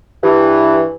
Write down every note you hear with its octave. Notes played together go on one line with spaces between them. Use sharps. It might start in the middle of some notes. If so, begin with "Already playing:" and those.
G2 E3